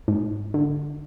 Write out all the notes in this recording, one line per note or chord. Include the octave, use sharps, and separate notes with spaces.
G#2
D3